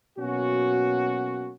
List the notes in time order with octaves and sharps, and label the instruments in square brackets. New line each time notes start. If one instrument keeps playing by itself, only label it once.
[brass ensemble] B2 F#3 A#3 C#4 F#4